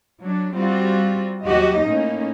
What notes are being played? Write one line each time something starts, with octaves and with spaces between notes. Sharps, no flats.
F#3 D4
G3 C4 F4 F#4
D#2 F#3 F#4 G4 D#5
A2 A#3 C#4 D#4